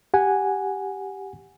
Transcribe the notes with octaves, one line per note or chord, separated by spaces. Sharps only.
G4 F#5 G#5